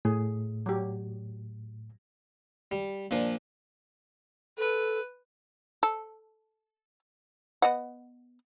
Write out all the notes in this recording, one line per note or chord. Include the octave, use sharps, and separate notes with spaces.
A2 G#4
F#3 G4
G3
A#2 F3 D4
A4 B4
A4
B3 D#5 F#5